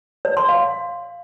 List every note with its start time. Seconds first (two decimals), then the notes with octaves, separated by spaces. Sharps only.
0.25 C#5
0.37 C6
0.49 F5